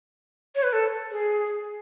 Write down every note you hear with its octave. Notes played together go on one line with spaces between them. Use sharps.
C#5
B4
A4
G#4